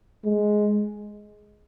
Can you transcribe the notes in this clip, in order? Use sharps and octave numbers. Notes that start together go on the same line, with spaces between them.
G#3